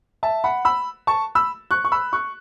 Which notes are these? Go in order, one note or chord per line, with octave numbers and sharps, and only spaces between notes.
E5 A5
F#5 B5
B5 E6
A5 C#6
B5 E6
C#6 F#6
C#6
B5 E6
C#6 F#6